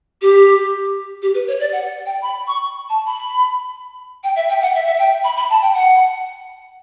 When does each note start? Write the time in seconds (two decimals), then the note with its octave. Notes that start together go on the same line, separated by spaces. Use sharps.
0.21 G4
1.22 G4
1.34 B4
1.47 C#5
1.59 D5
1.72 F#5
2.05 G5
2.22 B5
2.47 C#6
2.89 A5
3.06 B5
4.23 G5
4.35 E5
4.48 G5
4.61 F#5
4.74 E5
4.86 E5
4.98 G5
5.23 B5
5.36 B5
5.50 A5
5.61 G5
5.74 F#5